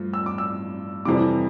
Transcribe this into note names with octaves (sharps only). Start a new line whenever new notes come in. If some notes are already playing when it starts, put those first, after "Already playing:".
Already playing: G2 F3 A3
E6
D6
E6
F2 C3 E3 G3 D6